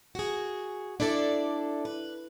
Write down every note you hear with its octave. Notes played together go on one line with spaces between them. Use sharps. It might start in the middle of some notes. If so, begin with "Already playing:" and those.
F#4 G#4
D4 E4 A4 D5
B4